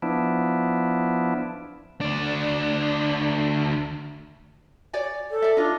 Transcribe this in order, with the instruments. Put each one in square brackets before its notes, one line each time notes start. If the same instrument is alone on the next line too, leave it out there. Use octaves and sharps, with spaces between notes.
[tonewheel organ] F3 B3 D4 E4
[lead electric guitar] D2 D4
[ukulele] C#5 D5 G#5
[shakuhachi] A4
[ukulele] D5 E5
[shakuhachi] D4 [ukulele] D#4 F4